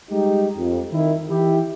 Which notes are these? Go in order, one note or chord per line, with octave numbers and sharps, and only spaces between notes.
G3 G#3 D#4 G4
F2
D#3 E4
E3 E4 G4